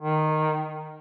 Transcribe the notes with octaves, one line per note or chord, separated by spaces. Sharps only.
D#3